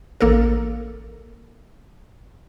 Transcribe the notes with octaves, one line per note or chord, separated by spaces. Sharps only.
A1 A#3 A4 A#4